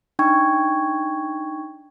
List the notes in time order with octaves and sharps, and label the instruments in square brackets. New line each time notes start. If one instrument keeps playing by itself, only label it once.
[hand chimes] D4 D#4 G5 C#6 G#6